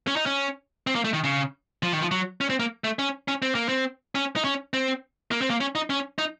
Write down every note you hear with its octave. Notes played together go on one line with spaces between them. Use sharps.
C#4
D#4
C#4
C4
A#3
A3
D#3
C#3
F3
D#3
F3
F#3
C#4
C4
A#3
A3
C#4
C#4
C4
A#3
C4
C#4
D#4
C#4
C4
A#3
C4
A#3
C#4
D#4
C#4
D#4